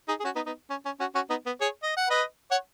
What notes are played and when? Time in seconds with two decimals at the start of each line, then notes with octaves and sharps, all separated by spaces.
0.08 D#4 G#4
0.20 G#4
0.24 C#4 F#4
0.36 B3 D#4
0.46 B3 D#4
0.70 C#4
0.85 C#4
1.00 C#4 F#4
1.15 C#4 F#4
1.30 B3 D#4
1.46 B3
1.61 G#4 C#5
1.83 D#5
1.97 F#5
2.09 B4 D#5
2.51 C#5 F#5